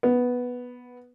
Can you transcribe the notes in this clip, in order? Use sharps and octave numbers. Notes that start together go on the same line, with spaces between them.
B3